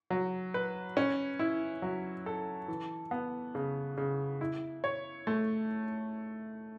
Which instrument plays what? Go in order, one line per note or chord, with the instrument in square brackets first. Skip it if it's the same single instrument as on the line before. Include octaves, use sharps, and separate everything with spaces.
[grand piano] F#3
B4
C#4
E4
F#3
A4
E3
B3
C#3
C#3
E4
C#5
A3